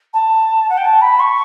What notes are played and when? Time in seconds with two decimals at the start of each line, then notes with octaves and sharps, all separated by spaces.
0.13 A5
0.69 F#5
0.77 G5
0.84 A5
1.01 B5
1.19 C#6